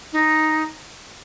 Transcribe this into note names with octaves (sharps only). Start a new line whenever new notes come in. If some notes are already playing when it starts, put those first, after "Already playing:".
D#4